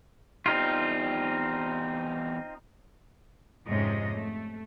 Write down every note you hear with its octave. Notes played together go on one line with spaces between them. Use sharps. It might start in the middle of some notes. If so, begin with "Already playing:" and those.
E2 G3 C4 D#4 F4
F2 G#2 C3 G#3 C#4 D#5
A3